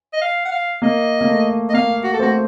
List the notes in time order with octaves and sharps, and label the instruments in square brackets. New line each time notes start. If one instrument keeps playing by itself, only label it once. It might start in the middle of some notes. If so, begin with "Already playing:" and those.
[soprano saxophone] D#5
F5
F#5
F5
[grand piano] A#3 [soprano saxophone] D#5
[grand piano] A#3
A3
[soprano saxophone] D#5
[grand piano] A#3 [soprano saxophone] F5
[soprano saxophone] F#4
A4
[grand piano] A3 C4 [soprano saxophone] F#4